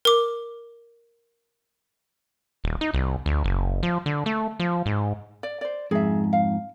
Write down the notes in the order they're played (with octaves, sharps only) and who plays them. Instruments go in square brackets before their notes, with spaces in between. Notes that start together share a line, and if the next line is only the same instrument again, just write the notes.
[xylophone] A#4 D6
[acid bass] D#1
D#4
C2
D2
F#1
F3
D3
A3
F3
G#2
[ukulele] D5
C5 D5
[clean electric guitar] F2 G#2 [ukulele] G#4 E5
[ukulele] F5